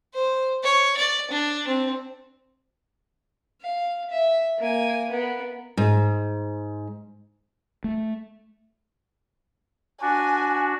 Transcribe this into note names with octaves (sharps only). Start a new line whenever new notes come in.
C5
C#5
D5
D4
C4
F5
E5
A#3 G#5
B3 A#4
G#2
A3
D4 F#4 G#5